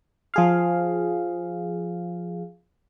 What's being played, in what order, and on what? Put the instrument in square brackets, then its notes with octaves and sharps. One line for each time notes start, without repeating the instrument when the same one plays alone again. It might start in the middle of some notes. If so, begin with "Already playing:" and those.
[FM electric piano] F3 G#4 F5